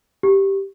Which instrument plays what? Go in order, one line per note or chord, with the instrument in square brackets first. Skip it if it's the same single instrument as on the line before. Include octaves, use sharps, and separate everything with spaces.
[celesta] G4